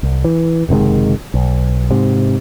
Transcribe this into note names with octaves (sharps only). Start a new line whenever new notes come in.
C2
E3
F#1 C3 D#3 G#3
B1
G#2 C3